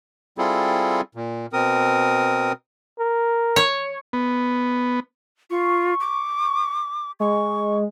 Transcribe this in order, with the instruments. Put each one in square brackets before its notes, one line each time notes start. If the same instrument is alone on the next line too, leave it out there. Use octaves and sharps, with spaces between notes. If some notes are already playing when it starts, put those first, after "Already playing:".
[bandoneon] G3 C4 E4 F4 G#4 A4
A#2
B2 C4 A#4 D#6
[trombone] A#4
[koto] C#5
[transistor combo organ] B3
[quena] F4 [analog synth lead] C#6
[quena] D6
[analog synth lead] G#3 [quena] C#6